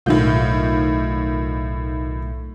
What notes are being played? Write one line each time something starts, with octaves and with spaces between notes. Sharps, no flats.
B1 A2 D#3 A3 F4 G6